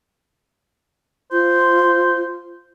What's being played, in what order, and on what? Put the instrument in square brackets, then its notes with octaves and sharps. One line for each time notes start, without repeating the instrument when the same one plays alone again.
[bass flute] F4 [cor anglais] C5